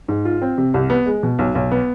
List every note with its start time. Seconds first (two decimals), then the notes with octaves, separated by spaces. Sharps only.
0.08 G#2
0.25 F4
0.42 C4
0.58 C3
0.74 C2
0.90 B3
1.06 G#3
1.23 B2
1.39 B1
1.55 B1
1.71 B3